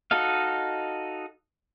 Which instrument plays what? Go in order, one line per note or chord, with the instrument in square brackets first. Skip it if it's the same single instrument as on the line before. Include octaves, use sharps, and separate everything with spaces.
[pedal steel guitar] D#4 F#4 A4 D#5 F5